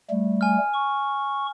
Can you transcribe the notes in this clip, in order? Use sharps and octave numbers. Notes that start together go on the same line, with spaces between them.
G3 A3
G#5 F6
C#6